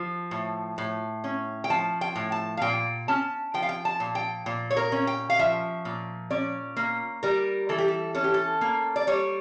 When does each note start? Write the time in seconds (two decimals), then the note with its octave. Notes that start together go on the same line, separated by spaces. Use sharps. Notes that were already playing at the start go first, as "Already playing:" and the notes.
Already playing: F3
0.31 A2
0.78 A2
1.24 C#4
1.64 G5
1.70 F3 A5
2.01 G5
2.15 A2
2.32 A5
2.57 F5
2.62 A#2 G5
3.08 C#4 A5
3.54 F3 G5
3.62 F5
3.69 G5
3.85 A5
4.00 A#2
4.15 G5
4.46 A#2
4.71 C#5
4.77 A#4
4.92 C#4
5.07 G5
5.30 F5
5.39 F3 E5
5.85 A#2
6.31 C#4 D5
6.77 A#3
7.23 G3 A#4
7.69 E3 A4
7.78 G4
7.88 A4
8.15 C#4 A4
8.24 G4
8.34 A4
8.61 A#3
8.96 D5
9.07 G3 C#5